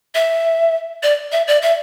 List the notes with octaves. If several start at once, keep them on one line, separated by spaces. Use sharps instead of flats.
E5
D5
E5
D5
E5